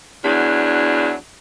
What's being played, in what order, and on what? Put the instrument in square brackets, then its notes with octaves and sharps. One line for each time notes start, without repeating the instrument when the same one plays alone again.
[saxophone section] E2 F#3 D4